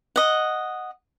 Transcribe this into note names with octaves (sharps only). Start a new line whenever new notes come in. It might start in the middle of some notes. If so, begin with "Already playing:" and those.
D#5 F#5